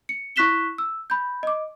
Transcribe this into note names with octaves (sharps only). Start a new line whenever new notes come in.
C#7
E4 C#6 F#6 B6 E7 G7
E6
B5 G6
D#5 D6